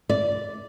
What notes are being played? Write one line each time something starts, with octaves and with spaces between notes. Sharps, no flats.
D5